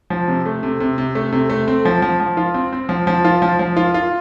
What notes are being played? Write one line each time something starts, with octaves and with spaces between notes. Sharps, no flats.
F3
C3
A3
C3
C3
C3
A3
C3
A3
C4
F3
F3
F3
F4
C4
C4
F3
F3
F4
F3
F3
F4
F4